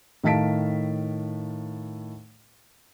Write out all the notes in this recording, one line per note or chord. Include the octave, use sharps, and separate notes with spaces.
A2 D#3 F5 A5 B6 D7